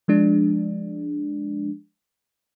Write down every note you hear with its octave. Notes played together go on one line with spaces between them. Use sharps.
F3 G#3 D4